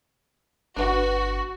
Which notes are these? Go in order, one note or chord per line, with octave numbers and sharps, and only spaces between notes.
G1 D4 F#4 B4 F#5